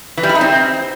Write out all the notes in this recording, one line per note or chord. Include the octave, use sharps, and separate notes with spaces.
E3
G3
E4
D#4
C4